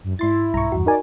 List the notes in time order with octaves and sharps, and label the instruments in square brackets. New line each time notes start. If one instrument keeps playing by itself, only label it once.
[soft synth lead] F#2
[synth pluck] G#2 C6 A6 [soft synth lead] E4
[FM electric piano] B1 G2 [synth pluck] A#5 C#6
[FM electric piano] E2 G2 [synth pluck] F#4
[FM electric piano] D#4 A#4 G#5 [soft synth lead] D5